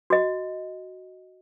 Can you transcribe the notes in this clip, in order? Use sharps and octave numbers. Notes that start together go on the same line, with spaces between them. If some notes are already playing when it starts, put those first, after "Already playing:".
F#4 D#5